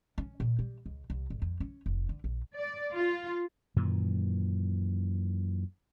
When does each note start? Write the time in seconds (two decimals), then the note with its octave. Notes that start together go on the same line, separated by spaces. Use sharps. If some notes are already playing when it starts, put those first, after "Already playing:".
0.18 C#4
0.40 A#2
0.59 G3
0.86 C#2
1.10 C2
1.30 G#1
1.42 F2
1.60 C#4
1.86 F1
2.09 D3
2.24 A#1
2.58 D5
2.94 F4
3.76 F#2 A#2 D#3 E3